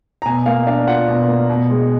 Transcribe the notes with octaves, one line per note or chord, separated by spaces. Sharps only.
A#5
B2 G#5
A#3 F5
D4 F5
F4 F#5
B2
A#3
B2
G#3